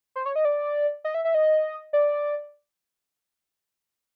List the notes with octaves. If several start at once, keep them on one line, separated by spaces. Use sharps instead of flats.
C5
C#5
D#5
D5
D#5
E5
E5
D#5
D5